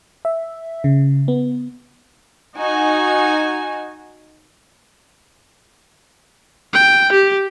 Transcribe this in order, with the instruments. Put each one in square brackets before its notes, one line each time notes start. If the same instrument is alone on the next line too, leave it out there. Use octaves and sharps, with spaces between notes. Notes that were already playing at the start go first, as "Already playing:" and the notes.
[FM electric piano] E5
C#3
B3
[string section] D#4 F#4 G#5
[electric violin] G5
G4